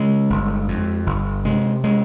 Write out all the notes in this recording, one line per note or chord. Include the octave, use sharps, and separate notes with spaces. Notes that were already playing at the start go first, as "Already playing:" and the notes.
Already playing: C#3 G#3
G1
F2
G1
C3 G#3
G#3